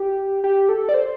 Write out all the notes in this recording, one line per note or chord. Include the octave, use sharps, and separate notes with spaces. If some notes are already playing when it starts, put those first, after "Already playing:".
Already playing: G4
G4
A4
D5
C5